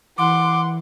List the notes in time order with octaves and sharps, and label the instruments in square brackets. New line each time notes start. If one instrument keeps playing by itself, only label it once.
[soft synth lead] E3 [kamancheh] F#5 C6 [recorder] D6